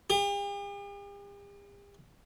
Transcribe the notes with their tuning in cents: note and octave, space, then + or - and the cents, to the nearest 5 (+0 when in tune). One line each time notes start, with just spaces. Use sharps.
G4 +45